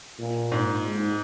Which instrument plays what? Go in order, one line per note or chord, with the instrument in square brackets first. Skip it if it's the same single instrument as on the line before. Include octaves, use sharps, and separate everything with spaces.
[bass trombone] A#2
[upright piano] G#2
[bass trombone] G#2